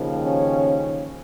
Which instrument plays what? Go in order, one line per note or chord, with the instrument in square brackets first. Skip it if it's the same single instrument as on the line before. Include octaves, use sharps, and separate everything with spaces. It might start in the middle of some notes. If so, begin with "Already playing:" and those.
Already playing: [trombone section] D#2 C#3 F3
C#4